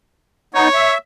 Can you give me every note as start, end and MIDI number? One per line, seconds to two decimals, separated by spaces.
0.54 0.68 59
0.54 0.68 63
0.54 0.93 73
0.74 0.98 76